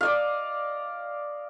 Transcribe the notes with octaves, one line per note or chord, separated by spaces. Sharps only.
D5 D#5 F5